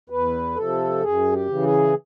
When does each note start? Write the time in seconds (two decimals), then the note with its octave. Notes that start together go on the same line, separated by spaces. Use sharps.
0.10 E2 B4
0.56 C3 F3 A4
1.01 F#2 G#4
1.32 G4
1.48 C#3 E3
1.63 G#4